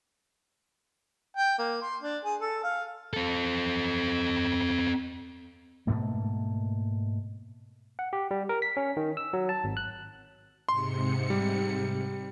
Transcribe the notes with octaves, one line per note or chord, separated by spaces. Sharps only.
G5
A#3
C6
D4
G#4
A4
F5
C4 A4
G#2 B2 A3 A#3
F#5
G4
G3
A#4
B6
C#4
D#3
E6
F#3
A5
G#1
F#6
G#2 C3 C6 C#7
G3